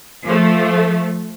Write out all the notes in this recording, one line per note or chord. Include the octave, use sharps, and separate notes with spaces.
F3 A3